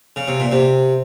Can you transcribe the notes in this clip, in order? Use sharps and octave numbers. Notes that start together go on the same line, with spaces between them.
C#3
C3
A#2
C3